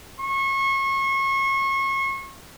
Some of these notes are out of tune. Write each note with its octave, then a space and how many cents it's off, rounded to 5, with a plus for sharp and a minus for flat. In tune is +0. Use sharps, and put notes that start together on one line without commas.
C#6 -30